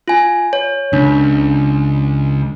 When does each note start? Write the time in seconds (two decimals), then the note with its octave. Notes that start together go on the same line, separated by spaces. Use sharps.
0.08 F4 G#5
0.53 C#5
0.93 C#2 D4